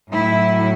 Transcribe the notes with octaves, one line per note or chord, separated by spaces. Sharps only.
A2 F#3 E4